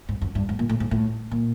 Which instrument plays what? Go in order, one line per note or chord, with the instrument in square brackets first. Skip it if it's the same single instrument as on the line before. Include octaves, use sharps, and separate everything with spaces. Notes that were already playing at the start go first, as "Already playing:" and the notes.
[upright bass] G#2
F#2
G2
G#2
A#2
A2
G#2
A2
A#2